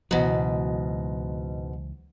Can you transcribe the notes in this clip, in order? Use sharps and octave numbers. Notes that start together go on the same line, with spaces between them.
C#2 G#2 B2 E3 F#3